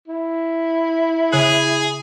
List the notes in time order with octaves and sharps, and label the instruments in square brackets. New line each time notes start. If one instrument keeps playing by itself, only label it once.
[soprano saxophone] E4
[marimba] C#3 F#6 [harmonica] G#4